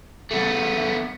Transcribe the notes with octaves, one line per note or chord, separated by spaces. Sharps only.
A3 B3